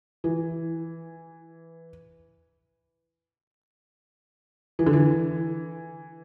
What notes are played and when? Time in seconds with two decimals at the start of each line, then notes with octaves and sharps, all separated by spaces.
0.24 E3
4.79 E3
4.86 D3
4.93 E3